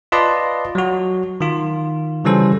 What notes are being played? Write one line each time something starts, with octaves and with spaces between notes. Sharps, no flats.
F4 B4 D5 D#5 A5 C6
F#3 F#4
D#3 F4
C#3 E3 G3 C#4 A4 C5